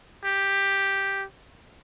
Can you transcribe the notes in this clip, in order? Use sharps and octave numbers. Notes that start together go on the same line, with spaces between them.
G4